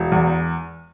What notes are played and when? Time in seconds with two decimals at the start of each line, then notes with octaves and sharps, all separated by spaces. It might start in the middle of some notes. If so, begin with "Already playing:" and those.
Already playing: E1
0.12 E2